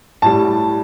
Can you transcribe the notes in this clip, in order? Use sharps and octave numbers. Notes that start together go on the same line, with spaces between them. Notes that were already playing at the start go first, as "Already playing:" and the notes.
A2 G3 A5